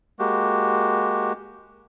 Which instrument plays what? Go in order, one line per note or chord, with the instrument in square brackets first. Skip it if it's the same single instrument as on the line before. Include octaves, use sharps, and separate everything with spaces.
[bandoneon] G#3 A#3 F#4 G4